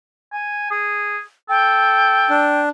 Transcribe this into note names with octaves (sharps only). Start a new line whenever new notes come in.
G#5
G#4
A4 G5
D4